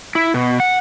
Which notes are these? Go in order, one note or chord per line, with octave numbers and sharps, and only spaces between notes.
E4
B2
F#5